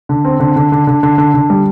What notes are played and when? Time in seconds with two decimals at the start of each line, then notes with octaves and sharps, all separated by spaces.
0.09 D3
0.25 C4
0.40 D3
0.56 D3
0.72 D3
0.87 D3
1.03 D3
1.18 D3
1.34 D3
1.50 G3